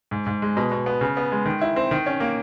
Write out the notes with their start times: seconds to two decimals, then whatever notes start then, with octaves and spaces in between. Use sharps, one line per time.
0.11 G#2
0.26 G#2
0.42 G#3
0.57 B2
0.72 B2
0.86 B3
1.01 C#3
1.17 B3
1.32 G#3
1.46 D#3
1.61 E4
1.76 C4
1.91 D#3
2.06 C#4
2.20 A#3